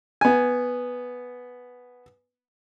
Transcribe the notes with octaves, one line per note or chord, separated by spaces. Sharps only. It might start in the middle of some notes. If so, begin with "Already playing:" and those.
B3 G#5